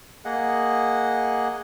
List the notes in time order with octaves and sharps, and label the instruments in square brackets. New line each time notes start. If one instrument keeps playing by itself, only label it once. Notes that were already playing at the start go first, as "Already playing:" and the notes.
[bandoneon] A#3 G#4 D#5 F#5